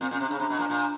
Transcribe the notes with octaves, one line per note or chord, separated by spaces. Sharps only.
A#2 C4
A#2 C#4
C3
D4
C#3
C3 D4
B2
A#2
A#2